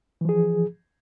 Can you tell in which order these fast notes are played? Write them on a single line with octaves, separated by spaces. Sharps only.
E3 F3 G#4